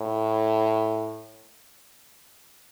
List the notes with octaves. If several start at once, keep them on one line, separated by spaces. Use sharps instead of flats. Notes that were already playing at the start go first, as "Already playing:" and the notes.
Already playing: A2